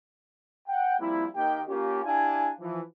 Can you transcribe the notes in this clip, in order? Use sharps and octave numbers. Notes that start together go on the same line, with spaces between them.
F#5 G5
F3 G3 A#3 C4 E4
D#3 A#3 G4 G5
A#3 C#4 F4 G4
D4 E4 G4 F5 G#5
E3 F3